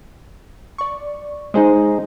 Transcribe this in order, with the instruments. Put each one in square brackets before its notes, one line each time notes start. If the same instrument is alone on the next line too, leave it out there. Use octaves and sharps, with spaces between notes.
[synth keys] D5 C#6
[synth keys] G#3 C5 [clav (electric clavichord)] D#4 G#4 D#5